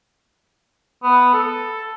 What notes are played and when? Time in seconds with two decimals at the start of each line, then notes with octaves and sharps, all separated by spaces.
1.03 B3
1.34 A4